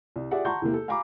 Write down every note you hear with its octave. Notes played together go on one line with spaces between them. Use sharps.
C2
F4 G4 G#4 D5 E5 F#5
F#5 A5 A#5 C6 C#6 G6
E2 C3 E3 A#3
A4
F5 G#5 A#5 B5 D6